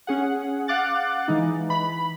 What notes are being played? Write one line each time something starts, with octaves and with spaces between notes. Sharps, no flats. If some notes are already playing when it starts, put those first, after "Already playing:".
C#4 G#4 F#5
F5 F#5 D6 F#6 A6
E3 G#3 D#4
E3 B5